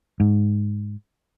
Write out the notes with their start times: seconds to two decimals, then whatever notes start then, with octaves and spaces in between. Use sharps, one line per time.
0.20 G#2